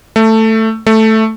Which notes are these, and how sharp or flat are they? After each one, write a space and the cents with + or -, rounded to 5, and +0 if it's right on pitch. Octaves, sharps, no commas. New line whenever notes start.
A3 +10
A3 +0